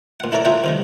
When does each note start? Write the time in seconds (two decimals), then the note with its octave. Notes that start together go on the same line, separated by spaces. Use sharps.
0.20 A#2 F#5
0.32 E4 A4 A#4 C#5 D5 D6
0.45 F4 G#4 E5 F#5 G5
0.64 C3 D#3 G3